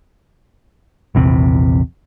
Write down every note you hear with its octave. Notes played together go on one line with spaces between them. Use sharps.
A#1 E2 C3